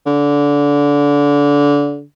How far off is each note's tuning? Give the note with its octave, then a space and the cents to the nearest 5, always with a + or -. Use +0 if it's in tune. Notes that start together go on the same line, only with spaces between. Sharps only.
D3 -25